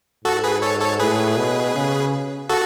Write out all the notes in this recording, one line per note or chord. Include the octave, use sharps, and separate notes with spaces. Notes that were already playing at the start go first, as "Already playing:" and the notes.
G#2 F#4 A4
G#4 B4
A4 C#5
A4 C#5
A2 G#4 B4
B2
C#3
F#4 A4